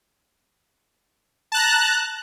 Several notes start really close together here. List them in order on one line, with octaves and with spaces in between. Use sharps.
A5 F#6 A#5